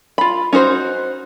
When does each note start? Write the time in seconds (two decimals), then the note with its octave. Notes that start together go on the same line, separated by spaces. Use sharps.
0.18 F4 B5
0.53 C#4 D#4 F#4 C5